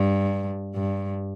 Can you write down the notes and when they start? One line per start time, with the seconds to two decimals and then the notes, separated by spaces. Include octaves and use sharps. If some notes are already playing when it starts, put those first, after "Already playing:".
Already playing: G2
0.75 G2